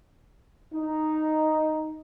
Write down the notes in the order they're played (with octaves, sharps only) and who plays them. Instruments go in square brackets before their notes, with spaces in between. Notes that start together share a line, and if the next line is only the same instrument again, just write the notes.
[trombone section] D#4